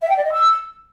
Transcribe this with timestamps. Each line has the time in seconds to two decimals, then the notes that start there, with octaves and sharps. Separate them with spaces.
0.01 E5
0.09 G5
0.16 D5
0.24 D#5
0.31 E6